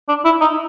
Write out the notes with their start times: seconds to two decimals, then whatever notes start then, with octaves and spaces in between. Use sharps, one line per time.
0.09 D4
0.25 E4
0.41 D#4